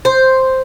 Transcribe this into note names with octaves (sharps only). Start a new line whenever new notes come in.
C5